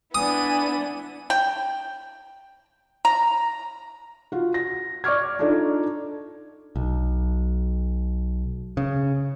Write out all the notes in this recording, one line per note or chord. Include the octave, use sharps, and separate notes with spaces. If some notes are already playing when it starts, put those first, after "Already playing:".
B3 D4 E4 G#5 D#6 D#7
G5
A#5
F4 F#4
A#6
D5 C#6 D6 F6 G#6
D4 D#4 F4 A4 D5
B1
C#3